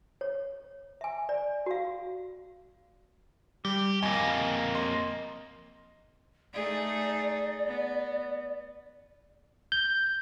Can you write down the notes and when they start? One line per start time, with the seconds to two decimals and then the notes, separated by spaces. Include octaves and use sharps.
0.21 C#5
1.01 E5 G#5
1.29 D5
1.66 F#4 F5
3.65 G3 G4
4.03 F2 A#3 D#5 G#5
4.75 D#5 C6
6.54 A3 D#4 G#4 D5
7.67 B3
9.72 G6